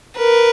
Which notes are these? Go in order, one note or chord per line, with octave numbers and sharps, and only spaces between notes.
A#4 B4